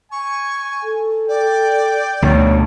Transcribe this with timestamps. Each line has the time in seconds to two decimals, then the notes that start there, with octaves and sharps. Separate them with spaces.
0.12 G#5 C#6
0.83 A4
1.29 D5 G5
2.22 D2 B2 D#3 C#5